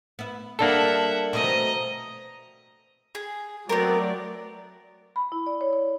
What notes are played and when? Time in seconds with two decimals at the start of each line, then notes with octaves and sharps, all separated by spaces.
0.19 B3 E4
0.59 G3 A#3 D4 A4 E5 F#5
1.33 B2 A3 C4 D#5 A#5
3.15 G#4
3.69 F#3 A3 B3 C4 A#4 D5
5.16 B5
5.32 E4
5.46 D5
5.61 C#5
5.73 C#5